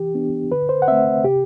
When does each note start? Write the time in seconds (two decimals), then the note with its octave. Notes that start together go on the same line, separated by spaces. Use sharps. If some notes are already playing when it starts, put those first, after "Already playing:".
Already playing: E3 G4
0.15 B3 D4
0.52 D3 B4
0.69 C5
0.82 F#5
0.88 A3 C4 E5
1.24 C3 G4